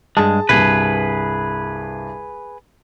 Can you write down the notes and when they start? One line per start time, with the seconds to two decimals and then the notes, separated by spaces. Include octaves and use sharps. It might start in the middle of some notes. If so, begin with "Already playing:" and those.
0.17 G2 G#3 G#4 A5
0.49 C2 G2 G#4 B4